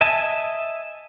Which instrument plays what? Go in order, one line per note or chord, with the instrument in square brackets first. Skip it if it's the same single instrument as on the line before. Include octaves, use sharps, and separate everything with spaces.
[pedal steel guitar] D#5 E5 G#5 A5